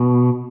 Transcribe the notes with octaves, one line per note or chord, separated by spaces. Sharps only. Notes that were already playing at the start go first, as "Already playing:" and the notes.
Already playing: B2